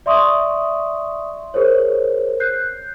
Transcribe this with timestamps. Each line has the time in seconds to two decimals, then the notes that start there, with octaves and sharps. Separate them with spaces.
0.06 D5 E5 C6 C#6 D#6
1.54 G#4 A#4 C5 C#5
2.40 F#6 G6 C7